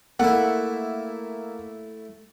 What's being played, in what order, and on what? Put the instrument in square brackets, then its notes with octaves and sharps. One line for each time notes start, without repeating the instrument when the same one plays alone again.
[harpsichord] A3 E4 [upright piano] A#3 [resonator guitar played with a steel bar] F#5